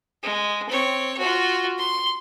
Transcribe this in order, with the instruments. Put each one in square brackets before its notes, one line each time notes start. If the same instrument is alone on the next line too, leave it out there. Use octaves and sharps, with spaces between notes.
[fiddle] G#3
C4 C#5
F4 F#4
C6